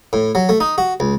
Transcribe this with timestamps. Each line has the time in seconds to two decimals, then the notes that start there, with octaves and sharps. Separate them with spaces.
0.13 A2
0.35 F#3
0.49 A3
0.60 D#4
0.78 F#4
1.00 C#2